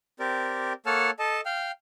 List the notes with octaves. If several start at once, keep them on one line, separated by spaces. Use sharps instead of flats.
C4 G4 A#4 D5
A#3 A4 C#5 F#5 A5 F6
A4 D#5 A5
F5 G5 F6